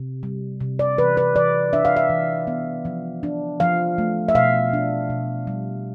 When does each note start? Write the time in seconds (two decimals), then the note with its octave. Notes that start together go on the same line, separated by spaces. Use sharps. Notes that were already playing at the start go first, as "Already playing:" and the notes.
Already playing: C3
0.23 G3
0.61 C3
0.79 D5
0.98 E3 B4
1.17 B4
1.36 E3 D5
1.73 D4 E5
1.85 F5
1.96 E5
2.10 E3
2.47 B3
2.85 F3
3.23 D4
3.60 F3 F5
3.98 A3
4.28 E5
4.35 B2 F5
4.73 D4
5.10 B2
5.47 G3